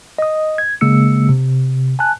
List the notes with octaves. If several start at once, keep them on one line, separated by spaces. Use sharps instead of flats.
D#5 D#6
G#6
C#3 G#3 A#3 E6 C#7
C3
G#5 A5 F#6